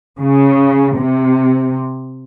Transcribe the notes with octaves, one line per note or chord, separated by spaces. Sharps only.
C#3
C3